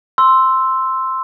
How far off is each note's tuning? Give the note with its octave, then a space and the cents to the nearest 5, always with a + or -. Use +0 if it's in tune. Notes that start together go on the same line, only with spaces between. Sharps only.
C6 +0 E6 +0